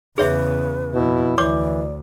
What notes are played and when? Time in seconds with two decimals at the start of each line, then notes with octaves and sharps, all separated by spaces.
0.18 E2 C#3 G#4 B4 C#5 E5
0.94 F2 B2 E4
1.38 D2 E3 C#5 D5 D6